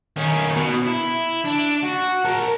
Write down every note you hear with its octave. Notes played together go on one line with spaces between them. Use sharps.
D#3 C#4
B2
E4
D4
F#4
A#4 A5